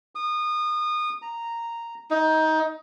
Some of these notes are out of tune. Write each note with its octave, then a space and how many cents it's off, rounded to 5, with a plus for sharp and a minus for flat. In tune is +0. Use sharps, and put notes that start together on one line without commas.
D#6 -25
A#5 -5
D#4 +20